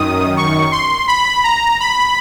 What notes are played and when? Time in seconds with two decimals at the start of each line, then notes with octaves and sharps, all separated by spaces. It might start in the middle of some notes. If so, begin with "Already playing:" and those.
Already playing: F#2 D#3 D#6
0.37 C#6
0.72 C6
1.08 B5
1.44 A#5
1.80 B5